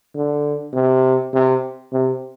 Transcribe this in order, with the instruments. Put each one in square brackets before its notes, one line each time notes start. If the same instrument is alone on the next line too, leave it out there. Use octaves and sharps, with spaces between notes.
[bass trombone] D3
C3
C3
C3